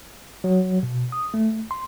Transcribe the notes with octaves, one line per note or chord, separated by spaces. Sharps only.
F#3
B2
D#6
A3
C6